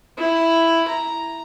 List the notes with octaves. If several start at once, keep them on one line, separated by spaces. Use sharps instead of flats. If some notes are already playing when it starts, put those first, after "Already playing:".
E4
A#5